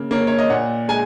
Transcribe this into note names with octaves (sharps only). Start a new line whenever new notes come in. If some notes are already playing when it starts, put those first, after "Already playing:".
Already playing: C#3 A#3
A#3 C#4
C#5
D#5
A#2 F#5
G#3 G#5